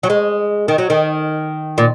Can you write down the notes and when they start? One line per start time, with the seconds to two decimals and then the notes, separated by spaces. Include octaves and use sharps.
0.03 F#3
0.10 G#3
0.68 D#3
0.78 F#3
0.90 D#3
1.78 A#2